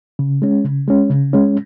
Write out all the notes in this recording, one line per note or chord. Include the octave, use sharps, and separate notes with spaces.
C#3
G#3 C#4
C#3
G#3 C#4
C#3
G#3 C#4